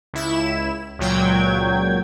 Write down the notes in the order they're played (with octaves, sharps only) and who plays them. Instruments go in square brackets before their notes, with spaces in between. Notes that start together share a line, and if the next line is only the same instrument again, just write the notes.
[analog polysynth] C#2 E4 E7
C#2 A#2 F#3 G5 G#6